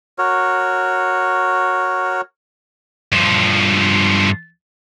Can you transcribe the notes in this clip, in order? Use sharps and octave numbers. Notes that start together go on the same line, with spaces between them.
F#4 A#4 C#5
G2 F3